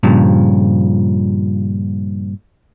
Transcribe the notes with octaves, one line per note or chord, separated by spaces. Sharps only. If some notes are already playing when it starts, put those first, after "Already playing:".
G2 A#2 C#3 F3